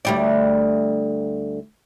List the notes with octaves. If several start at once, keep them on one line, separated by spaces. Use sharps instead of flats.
D2 G3 D5